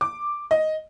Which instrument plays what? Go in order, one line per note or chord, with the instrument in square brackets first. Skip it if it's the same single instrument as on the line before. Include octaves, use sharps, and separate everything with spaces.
[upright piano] D6
D#5